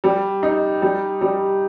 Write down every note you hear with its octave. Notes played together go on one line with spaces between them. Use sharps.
G3
D#4
G3
G3